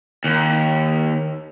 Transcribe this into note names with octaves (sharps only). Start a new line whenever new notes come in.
D#2